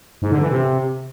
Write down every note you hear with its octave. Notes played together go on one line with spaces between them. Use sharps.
G#2
D3
E3
C3